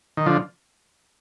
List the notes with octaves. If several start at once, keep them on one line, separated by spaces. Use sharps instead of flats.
D#3
D3 F3